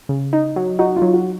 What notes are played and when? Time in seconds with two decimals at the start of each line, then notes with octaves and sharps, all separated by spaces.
0.09 C#3
0.33 D#4
0.56 F#3
0.79 D#4 F#4
0.96 F4
1.02 F#3
1.13 F#4